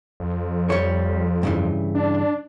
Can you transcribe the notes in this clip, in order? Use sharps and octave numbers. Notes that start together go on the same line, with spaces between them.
F2
G3 C#5
G2 C#3 E3
D4